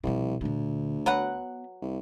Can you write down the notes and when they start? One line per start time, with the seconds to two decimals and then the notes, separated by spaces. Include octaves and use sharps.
0.04 C2 B2 F3
0.41 D2 A#2 D3
1.06 F#3 B3 B4 F#5
1.82 C2